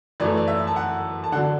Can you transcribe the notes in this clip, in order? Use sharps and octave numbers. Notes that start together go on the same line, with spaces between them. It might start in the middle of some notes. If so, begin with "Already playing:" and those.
F#2 E3 A3 E4 D5
D5
E5
A5
F#5
A5
D3 F#3 D4 F#5